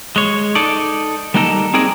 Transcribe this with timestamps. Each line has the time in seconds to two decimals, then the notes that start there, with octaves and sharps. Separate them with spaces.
0.16 G#3 C#5
0.55 D#4 A4 D5
1.34 G3 A#3 D#4 F#4 A4 A#4
1.74 C4 D#4 G#4 A#4 D5